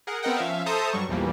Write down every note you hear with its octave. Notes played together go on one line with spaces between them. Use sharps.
G#4 A#4 F#5
B3 C4 A#4 D#5 F#5 G5
F3 C#4 E5 F5
A4 C5 E5 A5 A#5 D#6
G2 F#3 G3 C#6
A#1 E2 E3 F3 G3 A#3